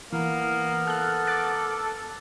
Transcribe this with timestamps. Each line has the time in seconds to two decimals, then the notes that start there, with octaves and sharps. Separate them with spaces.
0.12 E3 A#3 B3 A#4
0.87 A4 F6 F#6
1.27 D6 F#6 A6